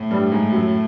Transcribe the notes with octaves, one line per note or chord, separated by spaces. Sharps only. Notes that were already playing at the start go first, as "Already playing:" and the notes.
Already playing: A2
G2 G3
G#2 G#3
F#2 F#3